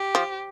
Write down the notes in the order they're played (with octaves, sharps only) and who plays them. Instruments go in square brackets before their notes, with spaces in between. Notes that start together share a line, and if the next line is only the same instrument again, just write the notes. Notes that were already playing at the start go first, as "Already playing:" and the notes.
Already playing: [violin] G4
[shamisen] F3